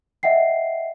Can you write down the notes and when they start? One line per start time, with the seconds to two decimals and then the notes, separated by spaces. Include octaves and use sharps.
0.23 D#5 E5 F#5 G5 C7